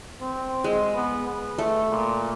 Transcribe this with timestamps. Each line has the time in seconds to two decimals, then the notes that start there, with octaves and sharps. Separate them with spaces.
0.22 C4
0.64 G#3
0.95 B3
1.28 B4
1.58 A3
1.91 A#2